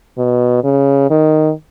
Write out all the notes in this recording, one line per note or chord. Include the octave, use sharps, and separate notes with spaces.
B2
C#3
D#3